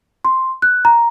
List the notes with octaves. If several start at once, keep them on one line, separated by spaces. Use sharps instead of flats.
C6
F#6
A#5